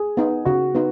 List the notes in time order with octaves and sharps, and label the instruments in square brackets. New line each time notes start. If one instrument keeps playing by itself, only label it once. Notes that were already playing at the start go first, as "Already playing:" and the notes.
Already playing: [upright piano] G#4
[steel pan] B3 D#4
[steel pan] C#3 [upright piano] F#4
[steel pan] B3 D#4